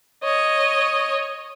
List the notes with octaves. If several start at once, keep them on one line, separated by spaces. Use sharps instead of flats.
C#5 D#5